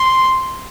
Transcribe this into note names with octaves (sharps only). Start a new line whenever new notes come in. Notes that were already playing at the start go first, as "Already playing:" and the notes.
Already playing: C6